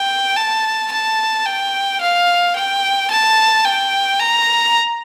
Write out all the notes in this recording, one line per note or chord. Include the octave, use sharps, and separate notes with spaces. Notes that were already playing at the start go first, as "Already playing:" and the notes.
Already playing: G5
A5
A5
G5
F5
G5
A5
G5
A#5